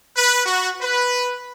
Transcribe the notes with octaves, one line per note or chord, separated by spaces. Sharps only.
B4
F#4
B4